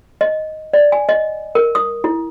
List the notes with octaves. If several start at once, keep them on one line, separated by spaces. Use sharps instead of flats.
D#5
D5
G#5
D#5
A#4
D#6
E4